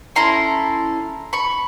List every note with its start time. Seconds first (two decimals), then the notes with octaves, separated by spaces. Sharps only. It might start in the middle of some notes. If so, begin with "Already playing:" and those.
0.15 C#4 E4 A4 A#5 C6
1.33 B5 C#6